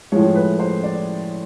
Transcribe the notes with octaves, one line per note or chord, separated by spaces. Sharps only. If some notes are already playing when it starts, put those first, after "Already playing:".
A2 F3 G#3 C#5
B4
C5
D5